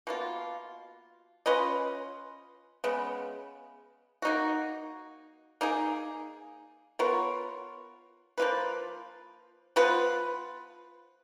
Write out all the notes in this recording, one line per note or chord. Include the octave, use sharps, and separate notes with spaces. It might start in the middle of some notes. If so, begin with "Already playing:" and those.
B2 A#3 F4
C#4 F4 B4 D#5
C#3 G#3 B3
A#3 D#4 F#4
A#3 D#4 G#4
B3 F4 A#4 C#5
F3 A#3 F4 B4
F3 B3 F4 B4